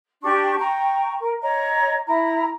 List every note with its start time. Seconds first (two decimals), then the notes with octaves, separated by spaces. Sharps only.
0.23 D4 G4 C#6
0.58 G5 A#5 C#6
1.20 A#4
1.42 C#5 D#5 A#5
2.07 E4 A#5